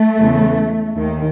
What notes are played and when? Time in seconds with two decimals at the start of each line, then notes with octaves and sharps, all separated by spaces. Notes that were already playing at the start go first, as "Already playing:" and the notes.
Already playing: A3
0.19 E2 C#3 E3
0.95 D#2 D#3